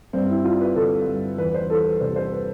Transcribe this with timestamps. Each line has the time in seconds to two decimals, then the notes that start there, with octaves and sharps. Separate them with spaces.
0.13 G2 C4
0.30 E4
0.44 G3 F4
0.61 B4
0.76 D3 A4
1.07 G2
1.38 E2 B4
1.54 C5
1.70 E3 A4
1.84 B4
2.00 C3 C5
2.16 C5
2.32 B4